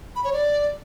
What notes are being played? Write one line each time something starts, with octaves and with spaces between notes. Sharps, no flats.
B5
C#5
D5